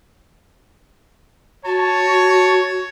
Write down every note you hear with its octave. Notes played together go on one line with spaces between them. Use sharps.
F#4 C#5 A5